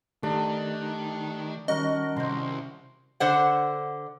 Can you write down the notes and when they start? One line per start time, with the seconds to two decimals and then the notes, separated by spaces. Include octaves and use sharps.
0.23 D#3 A3 D4 G4
1.68 D#3 G3 C#4 F#4 A#4 D#5
2.17 C2 C5 C6
3.20 D3 C5 F#5